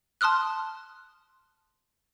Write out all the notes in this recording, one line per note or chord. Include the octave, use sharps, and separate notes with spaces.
A5 C6 D#6 F6 F#6